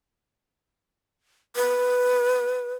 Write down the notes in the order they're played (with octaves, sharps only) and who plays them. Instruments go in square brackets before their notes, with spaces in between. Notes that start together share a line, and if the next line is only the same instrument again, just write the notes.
[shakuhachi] B4